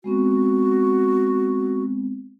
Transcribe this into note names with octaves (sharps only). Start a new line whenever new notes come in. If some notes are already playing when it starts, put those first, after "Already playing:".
G#3 B3 C4 F#4